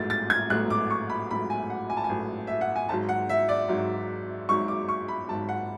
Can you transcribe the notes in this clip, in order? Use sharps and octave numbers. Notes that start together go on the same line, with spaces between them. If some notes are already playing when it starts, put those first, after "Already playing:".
Already playing: A1 G#2 F#3 A3 A6
A6
G#6
A1 G#2 F#3 A3 F#6
D6
C#6
B5
A1 G#2 F#3 A3 B5
G#5
F#5
G#5
A5
G#5
A1 G#2 F#3 A3
E5
F#5
G#5
G#1 G#2 F#3 A5
F#5
E5
D5
G#1 G#2 F#3
G#1 G#2 F#3 C#6
D6
C#6
B5
G#1 G#2 F#3 A5
F#5